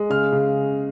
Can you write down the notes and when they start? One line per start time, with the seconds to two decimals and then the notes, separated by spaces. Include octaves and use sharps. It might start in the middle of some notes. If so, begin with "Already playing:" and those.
Already playing: G#3
0.10 C#3 F6
0.32 C#3